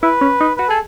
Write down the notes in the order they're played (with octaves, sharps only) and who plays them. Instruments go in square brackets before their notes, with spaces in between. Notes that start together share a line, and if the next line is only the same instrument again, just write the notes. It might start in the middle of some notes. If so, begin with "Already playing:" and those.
[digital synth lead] E4 [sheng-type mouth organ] B4
[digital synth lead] C#4
D#4
[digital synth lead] F#4 [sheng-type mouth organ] B4
[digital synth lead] G#4 [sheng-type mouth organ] A4